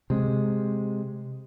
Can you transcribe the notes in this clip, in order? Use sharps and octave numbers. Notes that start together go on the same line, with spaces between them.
C3 G#3